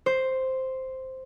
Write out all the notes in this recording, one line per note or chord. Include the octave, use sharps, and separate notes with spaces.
C5